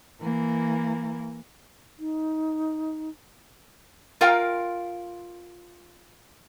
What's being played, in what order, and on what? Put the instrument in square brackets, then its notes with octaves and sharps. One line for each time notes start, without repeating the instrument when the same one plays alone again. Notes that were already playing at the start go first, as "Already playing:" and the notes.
[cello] E3 A#3
[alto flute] D#4
[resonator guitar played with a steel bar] F4 A#4 F5 G5